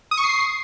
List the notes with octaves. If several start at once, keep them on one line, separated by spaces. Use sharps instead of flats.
D#6
C#6
C7